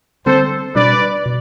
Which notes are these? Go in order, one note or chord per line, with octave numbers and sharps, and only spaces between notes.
D3 G3 C4 A4 C5
B2 G3 D4 B4 D5
B2